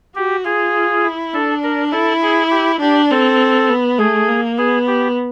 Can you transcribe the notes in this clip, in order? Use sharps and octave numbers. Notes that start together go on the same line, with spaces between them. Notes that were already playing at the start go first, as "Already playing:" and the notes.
F#4 G4
F4 G#4
E4
D4 A4
A#4
E4 A4
G#4
G4
D4 G4
C4 A4
B3
A3 G#4
A#3
B3 G#4
G4